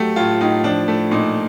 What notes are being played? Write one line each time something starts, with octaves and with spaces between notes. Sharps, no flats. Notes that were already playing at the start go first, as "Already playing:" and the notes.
Already playing: F#3 A3 G4
A2 F4
A2 D#4
F3 D4
A3
A#2 D#4